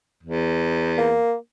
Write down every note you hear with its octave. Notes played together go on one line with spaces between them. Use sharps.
E2
A#3